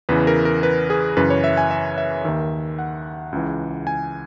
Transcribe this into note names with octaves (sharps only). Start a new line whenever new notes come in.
E2 C#3 E3 B4
A#4
A#4
B4
G#4
F#2 C#3 E3 B4
C#5
E5
G#5
E5
E5
D#2 D#3 E5
F#5
C#2 C#3 E3
G#5